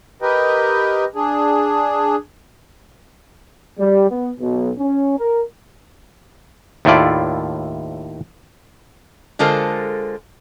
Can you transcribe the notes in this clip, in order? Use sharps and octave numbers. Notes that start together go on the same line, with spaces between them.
G4 A#4 B4 D#5 G5
D4 G#4
G3
B3
B1
C#4
A#4
D#2 A2 A3 E4 F4 D5
D3 G#3 F4 A4 A#4 C5